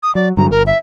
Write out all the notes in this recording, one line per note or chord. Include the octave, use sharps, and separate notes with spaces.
D#6
F#3 D5
G2 D3 F#3 A#5
G1 A#4
E5